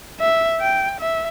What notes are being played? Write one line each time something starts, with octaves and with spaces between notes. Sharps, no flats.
E5
G5
E5